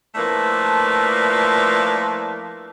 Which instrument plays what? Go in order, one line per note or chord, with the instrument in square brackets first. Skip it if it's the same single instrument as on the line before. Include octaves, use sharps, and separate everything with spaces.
[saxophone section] F3 A3 A#3 D4 E4 B4